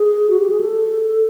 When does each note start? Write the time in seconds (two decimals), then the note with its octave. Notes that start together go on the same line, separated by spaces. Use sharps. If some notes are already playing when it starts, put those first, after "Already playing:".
Already playing: G#4
0.30 F#4
0.40 G4
0.50 G#4
0.61 A4